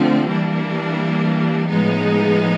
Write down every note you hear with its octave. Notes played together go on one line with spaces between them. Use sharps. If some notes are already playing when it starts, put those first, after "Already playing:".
Already playing: D3 F3 A3 C4
E3 G3 A#3 D4
A2 F3 G#3 B3 D#4